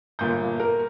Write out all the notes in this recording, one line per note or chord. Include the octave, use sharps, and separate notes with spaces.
G1 A#2 G6
A#4